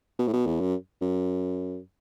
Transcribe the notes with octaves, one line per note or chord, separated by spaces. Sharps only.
B2
A2
B2
E2
F#2
F#2